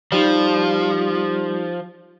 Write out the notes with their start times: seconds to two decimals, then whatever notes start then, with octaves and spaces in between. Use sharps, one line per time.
0.12 F3 G3 D#4 G4